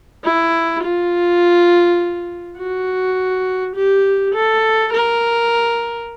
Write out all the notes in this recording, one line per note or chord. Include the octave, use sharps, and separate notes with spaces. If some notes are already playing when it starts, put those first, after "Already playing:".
E4
F4
F#4
G4
A4
A#4